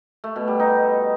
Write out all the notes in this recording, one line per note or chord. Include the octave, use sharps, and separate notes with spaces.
A3
B2
G3
D#4